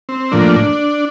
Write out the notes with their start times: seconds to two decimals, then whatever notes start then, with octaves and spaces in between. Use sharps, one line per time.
0.09 C4
0.32 A2 F3 A#3 D4